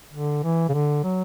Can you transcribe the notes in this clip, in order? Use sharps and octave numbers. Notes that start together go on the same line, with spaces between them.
D3
E3
C#3
D3
F#3